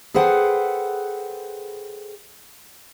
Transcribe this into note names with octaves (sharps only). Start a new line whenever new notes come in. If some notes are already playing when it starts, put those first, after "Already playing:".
G#4 A4 B4 C5 F#5 G5